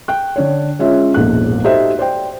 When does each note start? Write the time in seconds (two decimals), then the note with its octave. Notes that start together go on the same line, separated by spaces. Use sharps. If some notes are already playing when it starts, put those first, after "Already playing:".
0.08 G5 F#6
0.36 D3 D4 C#5
0.79 G#3 C#4 F4 E5
1.14 E1 A#1 G#2 A#3 A4 F#6
1.64 D#4 F#4 G4 A4 C5 E5
1.99 C5 D5 G5